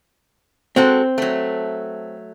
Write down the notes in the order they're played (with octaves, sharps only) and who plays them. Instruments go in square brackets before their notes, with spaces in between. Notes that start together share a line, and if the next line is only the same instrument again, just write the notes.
[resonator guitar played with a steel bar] G#3 F#4 A4 [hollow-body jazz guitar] C4
[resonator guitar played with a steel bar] F#3 A3